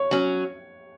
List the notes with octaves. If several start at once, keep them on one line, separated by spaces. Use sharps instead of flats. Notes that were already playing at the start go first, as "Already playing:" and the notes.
Already playing: C#5
F#3 C#4